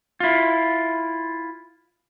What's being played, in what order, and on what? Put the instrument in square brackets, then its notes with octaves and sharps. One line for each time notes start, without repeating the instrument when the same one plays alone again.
[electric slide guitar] E4 F4